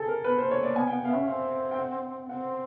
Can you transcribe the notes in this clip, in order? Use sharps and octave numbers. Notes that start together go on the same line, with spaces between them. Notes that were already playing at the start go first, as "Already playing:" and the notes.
Already playing: G#4 A4
A#4
B3 B4
A#3 C5
C#5
A#3 D5
B3 G#5
B3 G5
F#5
B3 F5
C#4 E5
C4 F5
G5
F#5
C4 F#5